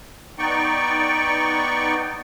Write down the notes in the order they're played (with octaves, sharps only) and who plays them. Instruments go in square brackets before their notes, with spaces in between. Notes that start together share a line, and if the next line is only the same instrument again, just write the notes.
[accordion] B3 D#4 D5 G5 C#6